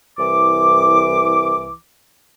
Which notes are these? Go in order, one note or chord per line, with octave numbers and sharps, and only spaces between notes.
C2 E3 D6